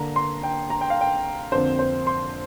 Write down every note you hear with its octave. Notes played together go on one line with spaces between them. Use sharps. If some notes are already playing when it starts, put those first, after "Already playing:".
Already playing: D3 A#3 D4 A#5
C6
G5
A#5
G5
F5
G5
F2 D3 A#3 D4 C5
C5
C6